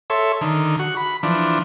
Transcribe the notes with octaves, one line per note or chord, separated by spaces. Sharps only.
A4 C#5 E5 C6
D3 D#3
F#4
B5
E3 F3 D4